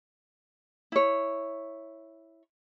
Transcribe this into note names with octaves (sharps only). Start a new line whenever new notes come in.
E4 C#5